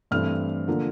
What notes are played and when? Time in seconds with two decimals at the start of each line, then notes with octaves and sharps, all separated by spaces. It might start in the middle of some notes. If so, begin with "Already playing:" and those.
0.11 G2 E3 A3 C4 E4 F6
0.68 D3 F3 A#3 D4